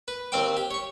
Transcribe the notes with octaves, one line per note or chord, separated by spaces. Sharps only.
B4
D#2 C4 C5 G5 D6
G4
C#5 C#6